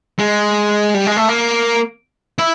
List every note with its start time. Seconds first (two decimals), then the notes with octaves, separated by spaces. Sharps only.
0.19 G#3
0.94 G3
1.06 G#3
1.17 A3
1.29 A#3
2.39 E4